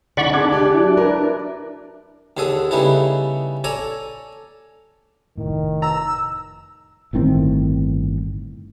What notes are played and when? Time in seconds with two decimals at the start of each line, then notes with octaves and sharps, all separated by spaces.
0.17 D3 D#4 D5 F#5 B5 C#6
0.33 D4 G#4 D6 G#6
0.52 G4 D5
0.74 F#3 E4
0.97 A#4 B4
2.37 D#2 D3 G#4 A4 D#6
2.71 C#3 G3 B3 D#4 E4 A4
3.64 A4 C#5 D5 G#5 A#5
5.38 F1 A2 D#3
5.82 A#5 E6
7.13 G1 A2 D#3 C4